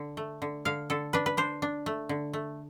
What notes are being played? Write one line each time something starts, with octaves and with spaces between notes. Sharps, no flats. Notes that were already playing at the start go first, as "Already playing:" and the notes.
Already playing: D3
A3
D3
D3 F5
D3 A4
D4 B4
B4
D4 C5
D4
A3
D3
A3